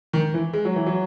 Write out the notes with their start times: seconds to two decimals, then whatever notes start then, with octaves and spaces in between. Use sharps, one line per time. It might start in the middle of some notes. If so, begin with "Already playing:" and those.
0.13 D#3
0.34 E3
0.53 G#3
0.65 F#3
0.76 E3
0.86 F#3